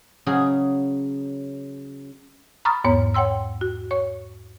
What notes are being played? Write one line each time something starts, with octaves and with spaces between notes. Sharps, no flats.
C#3 F#3 G#4
A#5 B5 C#6 D#6 F6 A6
E2 G#2 B3 C#5 A#5
C#5 F#5 G5 C6 E6
F#4
C#5 C#6